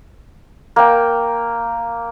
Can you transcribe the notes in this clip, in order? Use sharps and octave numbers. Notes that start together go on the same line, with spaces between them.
A#3 G5